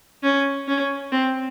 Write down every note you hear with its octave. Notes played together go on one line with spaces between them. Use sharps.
C#4
C#4
C4